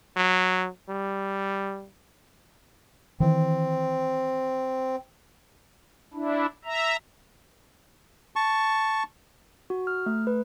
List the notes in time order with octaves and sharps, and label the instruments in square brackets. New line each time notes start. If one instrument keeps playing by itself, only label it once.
[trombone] F#3
G3
[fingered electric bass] D#3 E3 [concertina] C4
[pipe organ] D4 E4
E5 A#5
[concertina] A5 C#6
[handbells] F#4
F6
A3
B4